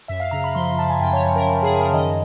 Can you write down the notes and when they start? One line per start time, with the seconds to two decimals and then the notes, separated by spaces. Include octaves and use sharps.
0.08 F#2 E5
0.20 F5
0.31 C#3 A#5
0.44 B5
0.55 F3 C6
0.67 B5
0.78 F3 A5
0.90 G#5
1.01 F#2 G5
1.13 C#5
1.25 F#2
1.36 A#4
1.47 F#2
1.63 G#4
1.70 F#2
1.79 A#4
1.93 D#3 D#5